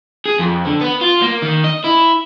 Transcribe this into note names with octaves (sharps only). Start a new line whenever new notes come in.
G#4
F2
D3
B3
F4
A#3
D#3
D#5
E4